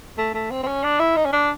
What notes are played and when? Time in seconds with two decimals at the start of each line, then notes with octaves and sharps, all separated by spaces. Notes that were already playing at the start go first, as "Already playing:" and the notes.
0.18 A3
0.34 A3
0.50 C4
0.63 C4
0.67 C#4
0.84 D4
0.99 E4
1.17 D#4
1.25 C#4
1.32 D4